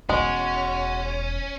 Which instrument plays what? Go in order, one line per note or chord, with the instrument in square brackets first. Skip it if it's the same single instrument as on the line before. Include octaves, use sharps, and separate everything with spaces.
[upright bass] E1 [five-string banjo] G#3 [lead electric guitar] C#4 [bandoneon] F#4